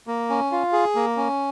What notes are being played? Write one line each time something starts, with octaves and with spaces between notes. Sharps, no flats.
A#3
C#4
F4
G#4
A#3
C#4